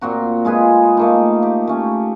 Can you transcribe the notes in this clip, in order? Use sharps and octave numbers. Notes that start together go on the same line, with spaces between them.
A#2 C4 F#4 A#5
G#3 F4 G#4 B4
A3 A#3 D#4
G4
A3 C#4